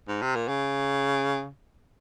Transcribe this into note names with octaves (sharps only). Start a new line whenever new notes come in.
G#2
C3
A#2
C#3